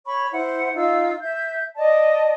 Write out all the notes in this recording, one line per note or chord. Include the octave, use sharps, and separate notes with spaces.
C#5 B5 C#6
E4 C5 F#5
D#4 F4 F5 E6
E5 G6
D5 D#5 A5